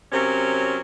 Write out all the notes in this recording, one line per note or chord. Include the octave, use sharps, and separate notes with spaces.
C3 F#3 C#4 A#4